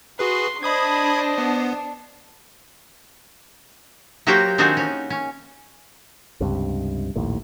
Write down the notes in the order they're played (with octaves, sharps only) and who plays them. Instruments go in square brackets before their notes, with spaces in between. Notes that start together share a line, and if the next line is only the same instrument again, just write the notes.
[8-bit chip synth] F#4 G#4 B4 [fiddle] C6
[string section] D4 [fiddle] C5 D#5 [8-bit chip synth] B5 D#6 G#6
[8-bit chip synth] B3
[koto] F#3 A#3 F#4 G4 C5 G5
D#3 C4 D4 D#4 F#4 G#4
C#4
C#4
[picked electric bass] C#2 G2 C3
A#1 D#2 A2